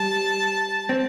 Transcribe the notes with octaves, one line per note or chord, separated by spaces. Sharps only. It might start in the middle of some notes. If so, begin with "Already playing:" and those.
Already playing: G3 A5
C4